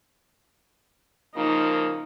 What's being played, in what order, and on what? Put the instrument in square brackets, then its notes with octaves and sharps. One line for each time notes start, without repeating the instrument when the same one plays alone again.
[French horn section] C#3 F3 A#3 [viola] D#4